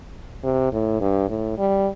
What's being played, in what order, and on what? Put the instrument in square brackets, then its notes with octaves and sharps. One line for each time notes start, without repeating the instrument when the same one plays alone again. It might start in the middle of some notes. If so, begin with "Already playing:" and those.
[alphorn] C3
A2
G2
A2
G3